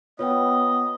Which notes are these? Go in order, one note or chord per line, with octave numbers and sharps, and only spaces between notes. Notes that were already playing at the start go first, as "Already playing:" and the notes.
B3 F4 B4 C#5 D#5 G5